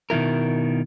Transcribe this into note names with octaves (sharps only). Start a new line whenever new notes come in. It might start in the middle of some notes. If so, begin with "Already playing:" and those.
B2 D#3 E3 E4 A#4